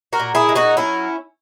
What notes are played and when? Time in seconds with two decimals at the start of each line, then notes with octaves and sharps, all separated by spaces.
0.13 F#4 A#4
0.19 A#2
0.35 E4 G#4
0.49 G#3
0.55 D#4 F#4
0.77 F#3 C#4 E4